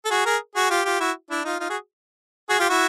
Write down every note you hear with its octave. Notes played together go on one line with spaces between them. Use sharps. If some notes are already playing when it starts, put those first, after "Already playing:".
A4
F#4 G#4
G#4 A#4
F#4 G#4
F4 G4
F4 G4
E4 F#4
D4 E4
D#4 F4
D#4 F4
F#4 G#4
F#4 G#4
F4 G4
E4 F#4